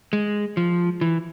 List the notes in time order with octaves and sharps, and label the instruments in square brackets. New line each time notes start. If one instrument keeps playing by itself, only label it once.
[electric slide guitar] G#3
F3
E3